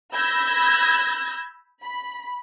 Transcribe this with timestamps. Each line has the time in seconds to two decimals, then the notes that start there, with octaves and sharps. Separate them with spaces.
0.14 B5 E6 G6 G#6 A#6
1.84 B5